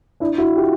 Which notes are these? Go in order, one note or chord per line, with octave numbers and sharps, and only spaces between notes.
D4 E4
E4 F#4
F4 G4